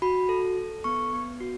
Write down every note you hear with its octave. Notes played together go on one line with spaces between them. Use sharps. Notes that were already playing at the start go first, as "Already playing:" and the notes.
F#4 B5
A4
A4
B3 C#6
B3
F#4